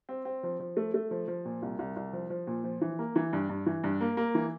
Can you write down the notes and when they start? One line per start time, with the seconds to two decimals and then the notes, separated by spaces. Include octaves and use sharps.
0.09 C4
0.25 C4
0.43 F3
0.60 F3
0.77 A3
0.94 A3
1.11 F3
1.28 F3
1.45 A#2
1.62 C2
1.79 C2
1.96 C2
2.13 F3
2.30 F3
2.47 A#2
2.64 F3
2.81 E3
2.99 A#3
3.16 E3
3.33 G2
3.49 G2
3.66 E3
3.84 G2
4.01 A#3
4.17 A#3
4.35 E3